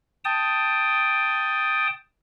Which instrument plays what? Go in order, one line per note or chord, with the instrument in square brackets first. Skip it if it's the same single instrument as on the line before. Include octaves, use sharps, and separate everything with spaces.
[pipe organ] G5 A5 D#6